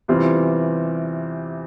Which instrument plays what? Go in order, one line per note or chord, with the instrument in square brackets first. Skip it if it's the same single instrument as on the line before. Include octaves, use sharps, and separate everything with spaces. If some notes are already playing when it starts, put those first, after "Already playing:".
[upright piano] E2 C3 G3 C4 F4 [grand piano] E3